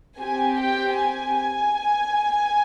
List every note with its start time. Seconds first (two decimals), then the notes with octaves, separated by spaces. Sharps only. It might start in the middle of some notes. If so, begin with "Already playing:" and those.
0.19 C4 G4 G#5
0.60 G5
1.01 G#5